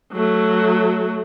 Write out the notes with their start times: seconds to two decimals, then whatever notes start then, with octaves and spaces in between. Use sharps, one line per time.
0.13 F#3 A3